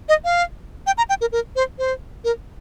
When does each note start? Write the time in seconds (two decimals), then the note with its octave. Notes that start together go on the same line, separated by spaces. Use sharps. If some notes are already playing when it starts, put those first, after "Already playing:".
0.09 D#5
0.24 F5
0.87 G5
0.98 A#5
1.09 G5
1.21 A#4
1.32 A#4
1.56 C5
1.79 C5
2.24 A#4